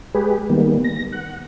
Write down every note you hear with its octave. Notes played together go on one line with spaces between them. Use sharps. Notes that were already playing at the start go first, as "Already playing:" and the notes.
G#3 G4 G#4 B4
D#3 G3 A#3 B3
A#6
F#5